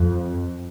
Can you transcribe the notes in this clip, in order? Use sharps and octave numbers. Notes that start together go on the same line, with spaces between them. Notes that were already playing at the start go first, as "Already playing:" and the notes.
Already playing: F2